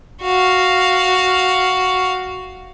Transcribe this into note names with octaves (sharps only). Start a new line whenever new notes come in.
F#4 F5